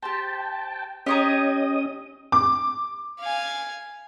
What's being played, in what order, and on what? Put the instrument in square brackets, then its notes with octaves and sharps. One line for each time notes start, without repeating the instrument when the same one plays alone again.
[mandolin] G4 C5 [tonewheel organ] G5 A5
[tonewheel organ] C#4 D#5 D#6 [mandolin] G4 C#5 A#5
[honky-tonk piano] D6
[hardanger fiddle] F5 G#5